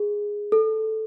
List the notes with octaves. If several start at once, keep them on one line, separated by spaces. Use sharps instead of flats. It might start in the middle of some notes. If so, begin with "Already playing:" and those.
Already playing: G#4
A4